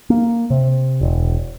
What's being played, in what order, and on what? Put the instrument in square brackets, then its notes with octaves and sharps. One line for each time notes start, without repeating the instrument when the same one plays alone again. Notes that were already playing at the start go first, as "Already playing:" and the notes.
[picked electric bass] A#3
C3
E1